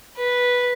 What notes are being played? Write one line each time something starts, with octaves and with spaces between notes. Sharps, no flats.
B4